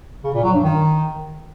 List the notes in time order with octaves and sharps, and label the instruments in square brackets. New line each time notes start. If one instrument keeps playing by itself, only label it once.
[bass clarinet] C#3
A#2
F#3
G2
D#3